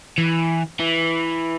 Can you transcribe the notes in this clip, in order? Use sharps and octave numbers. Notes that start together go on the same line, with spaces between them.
E3
E3